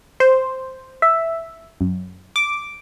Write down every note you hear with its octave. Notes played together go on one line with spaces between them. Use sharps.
C5
E5
F#2
D6